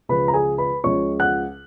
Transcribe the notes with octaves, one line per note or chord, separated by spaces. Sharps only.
C#2 C#3 F3 G#3 B4 B5
A#5
G#4 G#5
B4 B5
C#2 C#3 F3 G#3 C#5 C#6
F#5 F#6